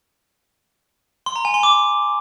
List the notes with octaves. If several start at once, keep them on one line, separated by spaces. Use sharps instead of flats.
C6
A#5
G#5
C6
D6